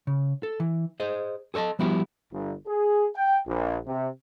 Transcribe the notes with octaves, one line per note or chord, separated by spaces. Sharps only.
C#3
A4
E3
G#4 C5 D#5
G#4 A4 C#5 D#5 A5
F3 G3 B3 E4 F#4 G4
G1
G#4
G5
A#1
C3